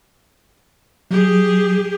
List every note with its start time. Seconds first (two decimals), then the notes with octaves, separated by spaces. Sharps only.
1.11 F#3 G4 G#4